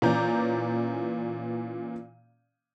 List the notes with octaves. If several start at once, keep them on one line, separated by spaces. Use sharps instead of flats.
A#2 E3 C#4 D5 A#5 G6